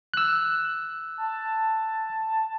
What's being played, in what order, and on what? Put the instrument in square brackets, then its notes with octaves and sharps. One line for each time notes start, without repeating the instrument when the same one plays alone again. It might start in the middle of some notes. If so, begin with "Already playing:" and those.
[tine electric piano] E6 F#6
[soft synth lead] A5